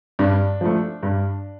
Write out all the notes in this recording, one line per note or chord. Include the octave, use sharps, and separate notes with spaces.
G2 D4
F3 A3
G2